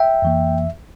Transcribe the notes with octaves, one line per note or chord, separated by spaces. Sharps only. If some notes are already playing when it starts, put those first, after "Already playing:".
Already playing: E5 G5
F2 E3 A#3